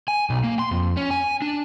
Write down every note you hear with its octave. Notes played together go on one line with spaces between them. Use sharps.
G#5
B1
A#3
C6
F2
C#4
G#5
D4